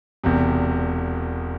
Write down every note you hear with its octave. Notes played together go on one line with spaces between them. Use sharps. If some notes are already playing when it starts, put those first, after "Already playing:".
E1 E2 C3